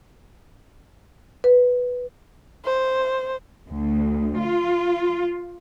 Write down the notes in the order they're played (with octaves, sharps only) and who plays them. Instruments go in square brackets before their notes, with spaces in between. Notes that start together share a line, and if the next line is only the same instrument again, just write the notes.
[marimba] B4
[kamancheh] C5
[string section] D2
F4